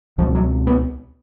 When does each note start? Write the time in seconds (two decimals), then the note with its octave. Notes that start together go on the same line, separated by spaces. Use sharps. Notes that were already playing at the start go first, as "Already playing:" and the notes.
0.18 C#2 B2 F3
0.35 F#3
0.67 B3